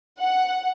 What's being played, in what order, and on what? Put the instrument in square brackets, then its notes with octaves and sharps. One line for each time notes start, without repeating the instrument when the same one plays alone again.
[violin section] F#5